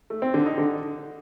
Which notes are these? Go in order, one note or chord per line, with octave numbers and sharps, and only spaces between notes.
A3
C4
D3
D#4
D3